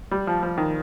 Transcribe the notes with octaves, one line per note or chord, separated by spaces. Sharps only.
G3
F3
F3
D#3